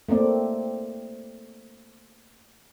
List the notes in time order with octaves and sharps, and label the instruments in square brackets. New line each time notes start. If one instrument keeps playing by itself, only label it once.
[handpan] A3 A#3 C4 D5